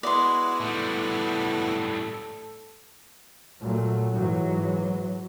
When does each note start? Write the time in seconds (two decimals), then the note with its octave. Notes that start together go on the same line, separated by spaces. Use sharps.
0.03 G#3 B3 E4 F#4 D5 C6
0.60 A2 G3 A4
3.60 A#2 F#3 A3
4.12 G#2 E3 F#3